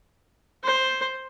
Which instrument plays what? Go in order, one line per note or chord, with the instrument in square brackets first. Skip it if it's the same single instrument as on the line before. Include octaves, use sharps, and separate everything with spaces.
[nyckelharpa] C5